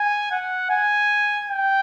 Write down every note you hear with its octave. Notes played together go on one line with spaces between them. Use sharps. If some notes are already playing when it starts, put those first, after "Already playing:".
Already playing: G#5
F#5
G#5
G5